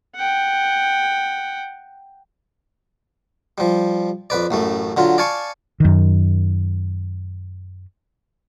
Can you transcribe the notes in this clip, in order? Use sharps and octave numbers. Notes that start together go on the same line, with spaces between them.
F#5 G5
F3 G3
F2 B4 D5
A1 F#2 A3
D3 F#3 F4
D5 F5 G#5 A5 C#6
F#2 D#3